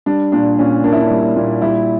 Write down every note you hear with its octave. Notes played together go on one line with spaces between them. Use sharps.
G3 D4
A#2 D4
A#2 C#4
A#3 D4
E4
D4
G3
A#2
G3 E4